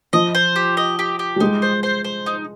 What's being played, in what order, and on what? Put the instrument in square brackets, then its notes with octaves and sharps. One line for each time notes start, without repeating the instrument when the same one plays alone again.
[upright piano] F3 [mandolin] D#5
[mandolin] C5
G4
D#5
G4
G4
[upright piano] G3
[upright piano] G#3 [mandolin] D#4
[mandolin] C5
C5
C5
D#4